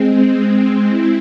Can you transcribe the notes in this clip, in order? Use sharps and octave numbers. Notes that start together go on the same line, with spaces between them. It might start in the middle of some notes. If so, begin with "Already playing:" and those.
Already playing: G#3 C4
C4 E4